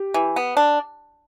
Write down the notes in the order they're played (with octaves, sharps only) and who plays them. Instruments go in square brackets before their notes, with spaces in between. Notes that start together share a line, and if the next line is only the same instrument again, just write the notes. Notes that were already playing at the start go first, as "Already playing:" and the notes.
Already playing: [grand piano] G4
[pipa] E3
B3
D4